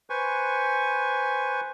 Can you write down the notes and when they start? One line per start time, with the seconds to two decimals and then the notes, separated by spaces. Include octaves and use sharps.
0.10 B4 C5 G#5 C#6